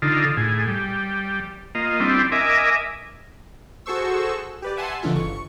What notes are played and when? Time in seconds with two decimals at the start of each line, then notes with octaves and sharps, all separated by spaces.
0.02 D3 D#4 F4 A4
0.37 A2 G#4
0.67 G3
1.75 A#3 F4 D#5
2.00 G3 C4 D4 E4
2.32 A#4 D#5 E5 G#5 D6
3.86 F#4 G#4 A4 C5 C#6 E6
4.62 G4 B4 D5
4.77 E5 F#5 G#5 A5 C6
5.02 C#3 E3 D4 D#4 F4 A4
5.15 G1 C#6